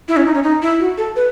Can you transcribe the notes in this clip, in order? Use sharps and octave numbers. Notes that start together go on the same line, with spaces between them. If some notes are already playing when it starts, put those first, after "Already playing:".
E4
C#4
D#4
C#4
D#4
E4
F#4
A4
B4